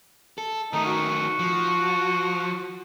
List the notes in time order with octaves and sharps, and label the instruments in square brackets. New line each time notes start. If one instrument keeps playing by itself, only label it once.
[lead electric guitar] A4
[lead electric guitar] D#3 A3 [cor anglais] D#4
[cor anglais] F#4
[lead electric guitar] F3